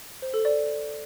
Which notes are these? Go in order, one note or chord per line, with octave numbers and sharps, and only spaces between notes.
C5
A4
D5